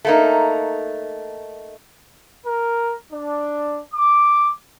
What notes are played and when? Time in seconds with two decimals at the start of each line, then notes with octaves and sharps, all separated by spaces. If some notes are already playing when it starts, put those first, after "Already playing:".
0.05 A3 A#3 D#4
2.45 A#4
3.11 D4
3.94 D6